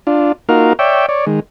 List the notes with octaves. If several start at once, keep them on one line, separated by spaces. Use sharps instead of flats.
D4 F4
A#3 D#4 F4 F#4 A#4 F5
C#5 D5 E5 G5
C#5 D5
D#3 G#3